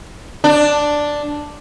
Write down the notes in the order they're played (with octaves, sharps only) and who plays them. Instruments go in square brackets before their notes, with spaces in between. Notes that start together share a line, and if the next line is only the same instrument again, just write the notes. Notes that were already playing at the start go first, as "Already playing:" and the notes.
[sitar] D4